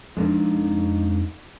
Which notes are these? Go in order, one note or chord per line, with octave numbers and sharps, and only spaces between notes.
F2 G#3 A3 D4 D#4